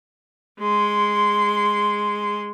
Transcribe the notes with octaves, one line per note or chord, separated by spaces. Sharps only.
G#3 C6